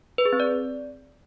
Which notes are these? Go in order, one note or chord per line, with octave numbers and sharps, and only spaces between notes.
B4
G#4
C4
D5